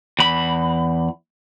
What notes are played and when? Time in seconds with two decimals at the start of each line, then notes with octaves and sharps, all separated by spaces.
0.19 E2 B5